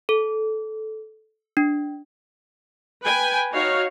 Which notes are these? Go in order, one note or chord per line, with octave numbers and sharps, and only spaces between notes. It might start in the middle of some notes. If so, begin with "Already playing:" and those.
A4
D4
B4 G5 G#5
D#4 F#4 C#5 F5